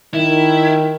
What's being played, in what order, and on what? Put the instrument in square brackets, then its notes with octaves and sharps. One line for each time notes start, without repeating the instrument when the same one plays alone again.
[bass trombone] D#3 [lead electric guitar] E4